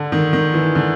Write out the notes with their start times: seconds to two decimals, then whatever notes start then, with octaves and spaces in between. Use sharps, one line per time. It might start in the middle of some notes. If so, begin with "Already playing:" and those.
Already playing: D3
0.12 D#3
0.33 D#3
0.54 E3
0.75 D3